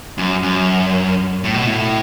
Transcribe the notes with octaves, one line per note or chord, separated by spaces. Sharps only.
F#2
F#2
A2
B2
A2